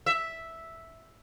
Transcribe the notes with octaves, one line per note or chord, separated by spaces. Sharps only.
E5